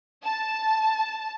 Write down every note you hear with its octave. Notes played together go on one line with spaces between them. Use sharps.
A5